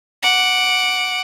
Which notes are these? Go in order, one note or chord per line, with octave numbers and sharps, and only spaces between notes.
F#5 D6